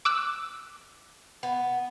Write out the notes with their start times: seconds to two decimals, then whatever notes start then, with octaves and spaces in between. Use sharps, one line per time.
0.05 D6 E6 F#6
1.43 B3